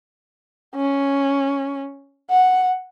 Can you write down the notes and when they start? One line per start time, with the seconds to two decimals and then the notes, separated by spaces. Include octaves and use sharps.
0.75 C#4
2.30 F#5